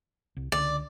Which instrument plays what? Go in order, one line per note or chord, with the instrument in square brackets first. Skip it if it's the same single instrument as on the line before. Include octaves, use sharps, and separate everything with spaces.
[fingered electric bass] C2
[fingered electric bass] C#2 D3 [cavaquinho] D5